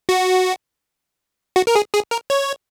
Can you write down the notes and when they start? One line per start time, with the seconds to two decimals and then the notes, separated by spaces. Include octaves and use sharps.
0.09 F#4
1.56 F#4
1.67 A#4
1.75 G#4
1.94 G#4
2.11 A#4
2.30 C#5